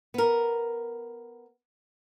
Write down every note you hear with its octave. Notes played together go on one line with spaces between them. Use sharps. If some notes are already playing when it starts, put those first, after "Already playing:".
B3 A#4